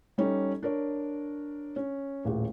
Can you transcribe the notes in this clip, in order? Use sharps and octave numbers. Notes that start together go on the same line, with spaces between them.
G3 C#4 D#4 A4
D4 A#4 C#5
C#4
D#1 A1 G#4